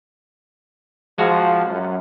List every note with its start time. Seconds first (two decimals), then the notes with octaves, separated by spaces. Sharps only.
1.18 F3 G#3 F#4 A#5
1.66 F#2